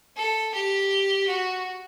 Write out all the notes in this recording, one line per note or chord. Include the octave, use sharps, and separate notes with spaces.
A4
G4
F#4